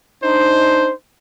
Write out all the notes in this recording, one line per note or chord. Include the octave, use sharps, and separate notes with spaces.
D4 D#4 C5